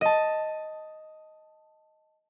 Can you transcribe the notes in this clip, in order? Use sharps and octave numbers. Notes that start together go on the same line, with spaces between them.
D#5 A5